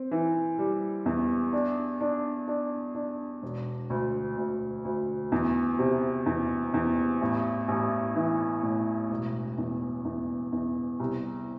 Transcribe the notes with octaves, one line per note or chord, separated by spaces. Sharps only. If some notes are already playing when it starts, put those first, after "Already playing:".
Already playing: C4
E3
G3
E2
D4
D4
D4
D4
E1
D2
D2
D2
E2
C3
E2
E2
A1
A1
E3
A2
E1
E2
E2
E2
C2